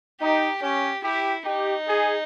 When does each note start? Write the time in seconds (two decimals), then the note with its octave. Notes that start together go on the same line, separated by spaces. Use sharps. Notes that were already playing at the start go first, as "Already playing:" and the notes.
0.21 D#4 G4
0.62 C#4 G4
1.04 E4 G4
1.46 D#4 G4
1.88 G#4